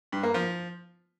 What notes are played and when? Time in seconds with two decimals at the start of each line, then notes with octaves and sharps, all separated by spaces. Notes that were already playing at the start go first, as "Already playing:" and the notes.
0.12 G2
0.23 A#3
0.34 F3